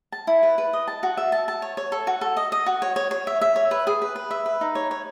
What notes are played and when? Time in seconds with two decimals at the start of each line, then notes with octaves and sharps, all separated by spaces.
0.12 A5
0.27 E4
0.43 B4
0.58 B4
0.73 D#5
0.88 A5
1.03 F#4
1.17 E5
1.32 A5
1.48 A5
1.62 C#5
1.77 C#5
1.92 A4
2.07 F#4
2.21 A4
2.37 D#5
2.52 D#5
2.66 F#4
2.82 C#5
2.96 C#5
3.11 C#5
3.27 E5
3.41 E5
3.56 C#5
3.71 B4
3.87 G#4
4.02 B4
4.16 B4
4.31 E5
4.46 B4
4.61 D#4
4.75 C#5
4.91 C#5